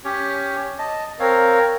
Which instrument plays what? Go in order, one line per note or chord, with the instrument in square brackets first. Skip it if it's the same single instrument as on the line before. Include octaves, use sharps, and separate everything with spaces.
[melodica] C#4 G4 C#5
D#5 A5
[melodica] C4 C#5 F5 [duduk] A#4